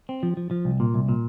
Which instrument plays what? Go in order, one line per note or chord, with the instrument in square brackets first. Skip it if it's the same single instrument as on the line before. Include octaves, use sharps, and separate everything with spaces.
[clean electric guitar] C4
F3
F3
F3
C2
A#2
C2
A#2